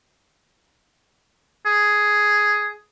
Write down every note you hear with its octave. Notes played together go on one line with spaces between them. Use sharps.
G#4